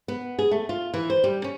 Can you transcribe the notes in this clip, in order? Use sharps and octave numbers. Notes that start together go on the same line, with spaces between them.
B3
G#4
A3
F4
E3
C5
G3
C#4